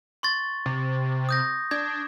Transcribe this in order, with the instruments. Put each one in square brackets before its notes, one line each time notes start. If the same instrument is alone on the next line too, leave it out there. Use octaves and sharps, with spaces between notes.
[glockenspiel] C6 C#6 A6
[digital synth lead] C3
[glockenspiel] D#6 G6 A#6
[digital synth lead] D4 [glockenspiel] G#6